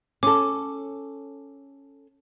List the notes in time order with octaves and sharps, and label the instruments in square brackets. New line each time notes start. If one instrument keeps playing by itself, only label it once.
[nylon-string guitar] C#4 A4 [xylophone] D6